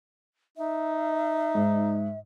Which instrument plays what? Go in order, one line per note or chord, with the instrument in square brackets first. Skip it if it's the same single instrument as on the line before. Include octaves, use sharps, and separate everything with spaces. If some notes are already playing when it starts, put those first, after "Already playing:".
[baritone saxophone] D#4 [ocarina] E5
[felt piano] G#2